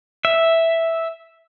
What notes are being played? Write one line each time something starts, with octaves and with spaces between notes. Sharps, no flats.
E5